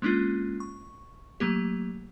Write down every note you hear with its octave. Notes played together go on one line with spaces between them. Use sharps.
G#3 A#3 C#4 D4 F4
C#6
F#3 A3 A#3 G4